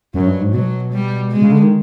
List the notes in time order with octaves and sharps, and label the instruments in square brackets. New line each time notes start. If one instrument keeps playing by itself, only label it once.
[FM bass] F#2 [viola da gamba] F#3
[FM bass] G2
G#2
[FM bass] B2 [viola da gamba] F#3
[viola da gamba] G3
G#3
[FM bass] C#3
D3
D#3